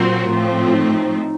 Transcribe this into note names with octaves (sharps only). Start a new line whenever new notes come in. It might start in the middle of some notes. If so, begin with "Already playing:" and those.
Already playing: A#2 F#3 C4 F4 F#4 A#4
A2 F3 A3 C4
D#4